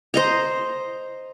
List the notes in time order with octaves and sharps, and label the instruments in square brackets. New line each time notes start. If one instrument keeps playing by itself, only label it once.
[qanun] C5 D#5 A#5